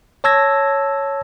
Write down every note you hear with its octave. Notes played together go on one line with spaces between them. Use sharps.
C#5 A5 E6 G#6 A#6